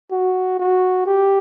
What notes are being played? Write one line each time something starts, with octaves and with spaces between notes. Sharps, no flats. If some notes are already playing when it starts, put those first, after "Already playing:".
F#4
F#4
G4